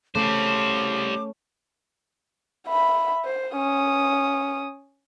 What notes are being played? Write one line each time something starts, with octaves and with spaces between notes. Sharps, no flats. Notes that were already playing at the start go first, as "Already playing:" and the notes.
C#3 G3 A3 C5 D6
E5 B5
C5
C#4 D#6